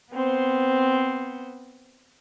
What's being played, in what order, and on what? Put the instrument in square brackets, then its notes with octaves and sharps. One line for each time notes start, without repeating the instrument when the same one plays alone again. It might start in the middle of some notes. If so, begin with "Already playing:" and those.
[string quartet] B3 C4 C5